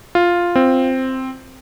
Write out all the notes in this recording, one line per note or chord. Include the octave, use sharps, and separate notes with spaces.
F4
C4